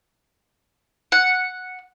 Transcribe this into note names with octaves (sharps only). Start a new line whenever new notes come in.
F#5